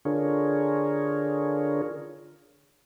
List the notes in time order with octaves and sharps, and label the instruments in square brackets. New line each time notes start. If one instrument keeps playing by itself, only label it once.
[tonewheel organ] D3 D4 F4 G#4 A#4 C#5